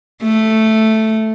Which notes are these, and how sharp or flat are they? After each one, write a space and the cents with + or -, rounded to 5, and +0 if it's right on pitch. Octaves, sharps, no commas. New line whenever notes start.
A3 +0